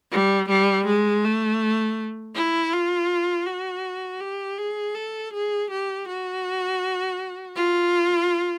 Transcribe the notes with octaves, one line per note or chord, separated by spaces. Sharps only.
G3
G3
G#3
A3
E4
F4
F#4
G4
G#4
A4
G#4
G4
F#4
F4